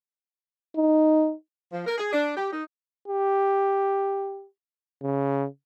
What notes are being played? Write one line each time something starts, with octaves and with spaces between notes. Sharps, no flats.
D#4
F3
A#4
G#4
D4
G4
D#4
G4
C#3